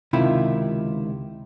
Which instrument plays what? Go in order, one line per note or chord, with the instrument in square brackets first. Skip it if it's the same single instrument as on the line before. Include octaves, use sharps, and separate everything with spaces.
[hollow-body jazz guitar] C#2 C3 D#3 E4 F4 B5